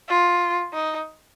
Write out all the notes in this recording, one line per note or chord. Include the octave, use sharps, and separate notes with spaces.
F4
D#4